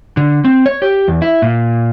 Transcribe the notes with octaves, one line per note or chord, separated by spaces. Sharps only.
D3
C4
C#5
G4
E2
E4
A#2